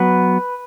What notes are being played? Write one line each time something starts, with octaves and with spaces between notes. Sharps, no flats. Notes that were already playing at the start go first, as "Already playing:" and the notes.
Already playing: F#3 B3 B4